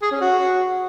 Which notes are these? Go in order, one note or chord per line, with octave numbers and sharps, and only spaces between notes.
G#4
C#4
F#4